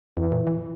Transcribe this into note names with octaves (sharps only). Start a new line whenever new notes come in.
F2 E3
A#2
E3